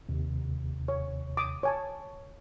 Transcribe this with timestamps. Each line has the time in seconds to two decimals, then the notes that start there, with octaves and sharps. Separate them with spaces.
0.09 D#2 C3
0.88 C#5
1.37 D6 D#6
1.63 C#5 G#5 A5